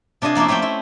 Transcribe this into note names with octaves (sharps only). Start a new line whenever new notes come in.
C3 D4 F4 D#5 G#5
F3 A#3 C4 C#4 E4
A3 C4 C#4 E5 G5
E4 G5